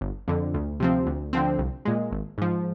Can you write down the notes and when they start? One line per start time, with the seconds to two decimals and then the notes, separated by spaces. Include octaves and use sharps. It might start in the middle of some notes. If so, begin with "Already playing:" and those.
0.01 G1
0.28 F2 D3
0.54 D2
0.80 C3 F3 C4
1.07 D2
1.33 D3 F3 C4
1.58 C2
1.85 A#2 G#3
2.11 G#1
2.38 G#2 F3